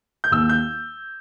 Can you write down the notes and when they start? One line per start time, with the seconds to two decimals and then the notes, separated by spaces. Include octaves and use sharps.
0.24 G6
0.31 D#2 E6
0.49 G6